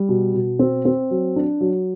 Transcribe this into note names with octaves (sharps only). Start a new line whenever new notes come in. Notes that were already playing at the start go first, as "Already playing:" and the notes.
Already playing: G3
B2
B2
C4
C4
F#3
D4
F#3